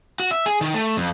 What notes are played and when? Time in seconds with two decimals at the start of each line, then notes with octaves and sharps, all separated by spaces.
0.20 F#4
0.31 E5
0.46 G#4
0.61 D#3
0.74 A3
0.97 F2